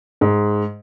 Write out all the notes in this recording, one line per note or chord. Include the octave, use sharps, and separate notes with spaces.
G#2